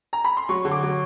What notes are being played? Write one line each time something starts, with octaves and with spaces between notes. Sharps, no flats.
A#5
B5
C6
F#3 C#6
D3
D6
F#3